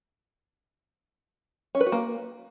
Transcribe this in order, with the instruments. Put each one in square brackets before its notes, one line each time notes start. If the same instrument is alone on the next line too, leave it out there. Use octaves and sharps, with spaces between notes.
[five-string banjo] C#4
B4
F#4
A#3